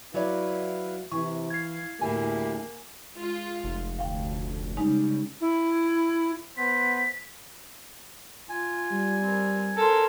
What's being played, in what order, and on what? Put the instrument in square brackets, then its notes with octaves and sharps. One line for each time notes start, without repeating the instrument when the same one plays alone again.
[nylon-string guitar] F#3 C#5 D5 [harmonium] E4 B4 F5
[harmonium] C3 [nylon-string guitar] E3 [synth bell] C#6
[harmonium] F5 [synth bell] G#6 C7
[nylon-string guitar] D2 A2 [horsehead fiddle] A#3 [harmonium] E4 G4 G#4 [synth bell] G#5
[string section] G#3 F4
[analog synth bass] F1
[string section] D2 [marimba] F5 G5
[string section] C#3 G3 [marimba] G#3 D#4
[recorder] E4
[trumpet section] B3 C5 [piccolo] B6
[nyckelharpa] F4 [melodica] G#5
[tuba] G3
[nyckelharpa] C4 A#4
[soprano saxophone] A4 [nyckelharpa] A#4 C5